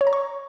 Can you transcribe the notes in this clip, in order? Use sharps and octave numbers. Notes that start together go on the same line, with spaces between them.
C#5
A#5
C#6